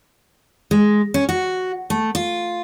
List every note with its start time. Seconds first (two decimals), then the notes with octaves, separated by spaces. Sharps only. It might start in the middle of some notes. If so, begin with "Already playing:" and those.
0.71 G#3
1.14 C#4
1.29 F#4
1.90 A3
2.15 F4